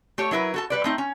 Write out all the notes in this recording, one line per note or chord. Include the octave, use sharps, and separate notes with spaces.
A3 G4 C#5
F#3 E4 A#4 B4
F#4 A4 A5
G3 B4 D5
A3 C4 D#4
C#4